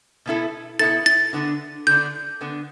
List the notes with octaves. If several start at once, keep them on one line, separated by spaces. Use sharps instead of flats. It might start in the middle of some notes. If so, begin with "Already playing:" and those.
B2 B3 E4 A4
B2 B3 E4 A4 A6
A6
D3 B3 D4
D3 B3 D4 G6
D3 B3 D4